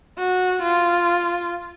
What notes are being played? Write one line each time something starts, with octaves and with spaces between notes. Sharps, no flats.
F#4
F4